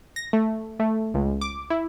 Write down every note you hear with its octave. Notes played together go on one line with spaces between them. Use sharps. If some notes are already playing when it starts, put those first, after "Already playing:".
A#6
A3
A3
C#2
D6
E4